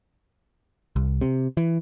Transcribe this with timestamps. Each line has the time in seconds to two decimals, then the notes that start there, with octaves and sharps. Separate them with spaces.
0.96 C2
1.21 C3
1.57 E3